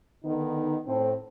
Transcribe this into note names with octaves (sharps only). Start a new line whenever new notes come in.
D3 D#3 B3 D#4
A2 C4